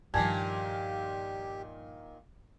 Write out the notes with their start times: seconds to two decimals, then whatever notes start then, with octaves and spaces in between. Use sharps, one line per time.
0.14 G2 A#2 D#3 F3 G4 G#5 A5 G#6